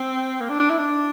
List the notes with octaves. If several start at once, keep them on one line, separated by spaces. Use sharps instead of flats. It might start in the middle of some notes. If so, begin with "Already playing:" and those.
Already playing: C4
A#3
D4
D4
E4
D4